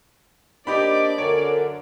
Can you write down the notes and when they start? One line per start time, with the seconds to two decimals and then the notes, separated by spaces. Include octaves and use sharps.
0.67 A#3 C4 D4 D#4 G4 D5 B5
1.18 F#2 D3 A#4 C#5